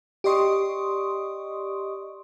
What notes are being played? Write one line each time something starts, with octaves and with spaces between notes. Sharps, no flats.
G4 D5 D#5 C6 C#6 D#6